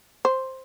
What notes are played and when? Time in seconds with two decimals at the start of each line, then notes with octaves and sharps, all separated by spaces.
0.25 C5